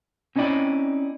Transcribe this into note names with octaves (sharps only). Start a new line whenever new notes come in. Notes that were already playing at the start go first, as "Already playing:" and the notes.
C4 C#4 D#4 E4 D5 G5